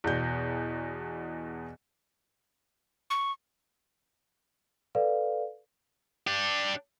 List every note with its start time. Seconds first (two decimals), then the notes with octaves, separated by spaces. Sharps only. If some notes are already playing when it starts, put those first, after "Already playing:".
0.04 E2 B2 G6
3.10 C#6
4.95 A4 B4 D5 F5
6.27 D4 G4